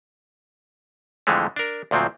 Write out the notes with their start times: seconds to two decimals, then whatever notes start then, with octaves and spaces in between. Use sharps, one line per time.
1.27 F2 D3 E3 F3 G#3 A3
1.56 D4 A#4
1.91 D2 A#2 F3 F#3 C4